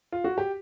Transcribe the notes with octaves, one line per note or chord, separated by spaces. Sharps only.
F4
F#4
G4